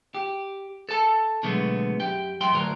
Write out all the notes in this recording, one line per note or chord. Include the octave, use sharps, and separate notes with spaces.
G4
A4 A5
B2 D3 F#3 G#3 A3 B3
F#2 G4 G5
F#2 G5 C6
D2 A2 F#3 A#4